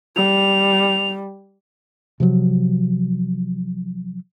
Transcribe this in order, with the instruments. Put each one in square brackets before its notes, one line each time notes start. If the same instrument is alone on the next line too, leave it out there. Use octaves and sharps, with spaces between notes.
[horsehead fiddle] G3 [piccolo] F7
[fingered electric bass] C3 F3 F#3